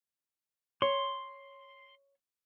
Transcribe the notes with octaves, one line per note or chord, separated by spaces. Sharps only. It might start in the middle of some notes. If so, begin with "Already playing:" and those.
C#5 C6